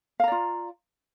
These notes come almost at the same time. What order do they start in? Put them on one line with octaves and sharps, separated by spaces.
F5 A#5 D5 F4